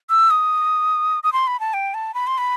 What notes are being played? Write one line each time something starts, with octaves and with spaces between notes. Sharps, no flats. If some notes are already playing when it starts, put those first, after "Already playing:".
E6
D#6
D#6
C6
B5
A5
G5
A5
B5
C6
B5